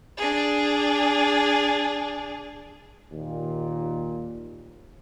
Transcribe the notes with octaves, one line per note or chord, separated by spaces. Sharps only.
D4 G#4
D#2 A#2